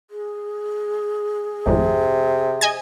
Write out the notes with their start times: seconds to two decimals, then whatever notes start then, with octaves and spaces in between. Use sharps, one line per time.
0.11 G#4
1.66 G#1 F2 A2 C3
2.61 D#5 G#5 G#6